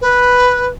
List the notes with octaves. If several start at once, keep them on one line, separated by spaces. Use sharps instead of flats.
B4